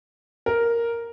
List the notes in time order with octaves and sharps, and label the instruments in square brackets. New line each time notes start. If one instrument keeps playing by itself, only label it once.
[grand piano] A#4